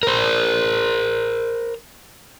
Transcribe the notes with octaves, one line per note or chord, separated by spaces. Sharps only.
A#4 C5